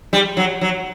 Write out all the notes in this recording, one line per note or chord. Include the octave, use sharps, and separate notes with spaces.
G3
F#3
F#3